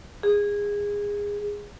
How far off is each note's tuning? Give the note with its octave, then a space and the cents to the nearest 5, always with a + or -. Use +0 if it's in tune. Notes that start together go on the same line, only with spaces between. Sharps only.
G#4 -20